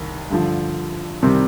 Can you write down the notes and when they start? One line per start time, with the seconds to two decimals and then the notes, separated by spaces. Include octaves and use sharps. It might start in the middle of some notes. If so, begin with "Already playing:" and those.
Already playing: C2 D#3
0.30 G2 D3 F3
1.23 C2 C3 D#3 G3 C4